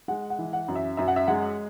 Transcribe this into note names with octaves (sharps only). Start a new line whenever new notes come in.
G#3 F#5
F#5
E3
F#5
F#2
E5
F#2 E5
F#5
E5
G#3 F#5